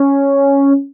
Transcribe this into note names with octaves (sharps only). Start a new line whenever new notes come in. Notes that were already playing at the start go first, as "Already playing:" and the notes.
Already playing: C#4